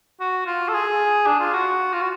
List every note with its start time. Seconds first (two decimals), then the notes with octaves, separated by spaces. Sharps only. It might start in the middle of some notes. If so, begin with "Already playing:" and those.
0.20 F#4
0.46 F4
0.68 A4
0.74 G#4
1.26 D4
1.40 F4
1.53 F#4
1.93 F4
2.01 F#4